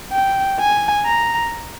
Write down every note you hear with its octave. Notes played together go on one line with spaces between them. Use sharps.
G5
G#5
A#5